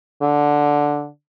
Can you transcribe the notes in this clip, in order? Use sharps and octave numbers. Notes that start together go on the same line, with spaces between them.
D3